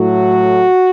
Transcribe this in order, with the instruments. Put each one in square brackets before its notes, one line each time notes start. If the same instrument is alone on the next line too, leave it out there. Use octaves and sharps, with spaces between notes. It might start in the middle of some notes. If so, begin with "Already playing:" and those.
Already playing: [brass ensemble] A2 F#3 A3 F#4